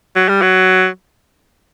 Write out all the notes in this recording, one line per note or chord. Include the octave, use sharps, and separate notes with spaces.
F#3
G3
F#3